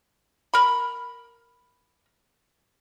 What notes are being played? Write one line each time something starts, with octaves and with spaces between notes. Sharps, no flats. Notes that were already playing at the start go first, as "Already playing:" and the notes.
A#4 B5